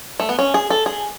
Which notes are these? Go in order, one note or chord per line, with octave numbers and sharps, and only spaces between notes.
A3
B3
C#4
G#4
A4
G#4